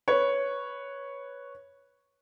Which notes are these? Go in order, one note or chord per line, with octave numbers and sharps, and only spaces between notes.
B4 C#5